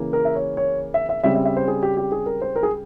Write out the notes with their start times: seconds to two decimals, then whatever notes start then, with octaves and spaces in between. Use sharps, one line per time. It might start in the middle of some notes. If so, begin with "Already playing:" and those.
Already playing: C#3 E3 A#3
0.13 A#4
0.25 E5
0.35 C#5
0.57 C#5
0.94 E5
1.09 E5
1.24 C#3 G3 C4 E5
1.35 E5
1.45 E5
1.57 C5
1.68 G#4
1.83 G4
1.97 G4
2.12 G#4
2.26 A#4
2.42 C5
2.56 A#4
2.63 G#4